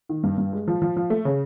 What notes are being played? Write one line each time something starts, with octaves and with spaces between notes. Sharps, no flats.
D#3
G2
G2
G#3
F3
F3
F3
A3
C#3